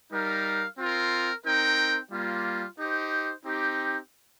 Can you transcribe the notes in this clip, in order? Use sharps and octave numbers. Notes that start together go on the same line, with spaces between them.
G3 D#4 A#4 F5
C4 F4 A#4
C4 D#4 A#4 G5
G3 A#3 F4
D#4 G4 C5
C4 D#4 G4